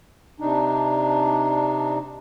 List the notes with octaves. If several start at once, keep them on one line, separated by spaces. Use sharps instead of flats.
C3 D4 D#4